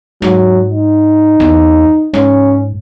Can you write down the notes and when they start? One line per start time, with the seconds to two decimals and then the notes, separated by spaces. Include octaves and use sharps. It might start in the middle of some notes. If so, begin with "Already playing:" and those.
0.22 G#2 F#3
0.72 D#4
1.40 E2
2.14 G#2 C#4